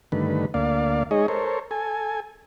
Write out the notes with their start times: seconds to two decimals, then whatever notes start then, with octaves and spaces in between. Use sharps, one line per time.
0.12 G2 D3 D#3 A3 B4
0.54 D2 A#3 D5 F5
1.11 G#3 D#4 G#4 C#5 D#5
1.28 A4 A#4 C5 C#5
1.71 A4 G#5